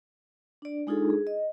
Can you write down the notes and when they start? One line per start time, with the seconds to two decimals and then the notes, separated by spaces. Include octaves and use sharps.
0.62 D4 D5
0.87 G#3 D4 D#4 F4 G#4 A4
1.10 G#4
1.27 D#5